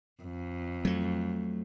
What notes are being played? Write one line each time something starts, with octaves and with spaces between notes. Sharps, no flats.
F2
F#3 A3